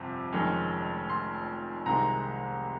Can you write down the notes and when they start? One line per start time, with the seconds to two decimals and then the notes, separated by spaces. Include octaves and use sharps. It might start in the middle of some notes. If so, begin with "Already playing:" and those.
Already playing: G1 F2 C3
0.32 F1 F2 D#3 G#3 C#4
1.09 C6
1.86 C2 C3 D#3 G#3 C4 A#5